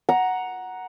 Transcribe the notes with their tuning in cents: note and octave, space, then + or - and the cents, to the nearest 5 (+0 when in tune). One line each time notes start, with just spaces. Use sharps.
F#5 +0 A#5 +10